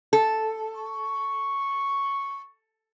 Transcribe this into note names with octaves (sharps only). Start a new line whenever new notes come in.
A4
C#6